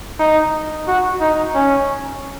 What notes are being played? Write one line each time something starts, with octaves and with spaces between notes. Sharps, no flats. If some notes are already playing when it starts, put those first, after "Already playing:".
D#4
F#4
D#4
C#4